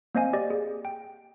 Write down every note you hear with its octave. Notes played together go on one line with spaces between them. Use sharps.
A#3 C4 C5 D#5 F5 G#5
G4 D5 D#5
G#4
G5